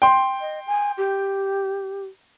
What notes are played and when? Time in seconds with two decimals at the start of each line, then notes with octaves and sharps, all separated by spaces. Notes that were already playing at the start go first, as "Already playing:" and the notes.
0.02 G5 C6
0.41 D#5
0.67 G#5
0.97 G4